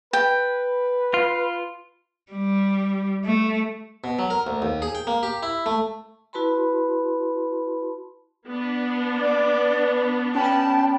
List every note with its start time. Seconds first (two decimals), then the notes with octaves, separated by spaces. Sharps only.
0.13 B4 G5
1.14 F4
2.32 G3
3.25 A3
4.04 B2
4.19 F#3
4.30 A#4
4.47 D2
4.62 D#2
4.82 G#4
4.95 G5
5.07 A#3
5.23 G4
5.43 E4
5.66 A3
6.33 E4 F#4 B4 A5 B5 C6
8.47 B3 D4
9.20 D5
9.52 B4
10.35 C#4 G5 A5 B5